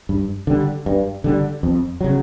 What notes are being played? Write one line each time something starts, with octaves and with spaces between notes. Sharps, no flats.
G2
D3 G3
G2
D3 G3
F2
C#3 F#3